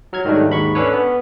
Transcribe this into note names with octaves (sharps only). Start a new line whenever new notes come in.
F#3 F6 G#6
G#2 D#3 F#3 G3 A3 D4
D#2 G#2 B5 C#6
C#4 D4 A4 B4 C#5
B3